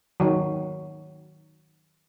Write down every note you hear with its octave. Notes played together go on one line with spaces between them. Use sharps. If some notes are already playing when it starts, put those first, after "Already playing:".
D#3 F#3